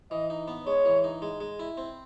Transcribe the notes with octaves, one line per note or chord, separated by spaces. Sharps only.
E3 D#5
D#4
B3
G#3 C#5
E3
D#4
G#3
G#3
E4
C4